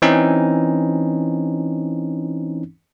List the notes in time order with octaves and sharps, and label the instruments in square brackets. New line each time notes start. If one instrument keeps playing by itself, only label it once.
[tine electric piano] E3 C4 C#4 D#4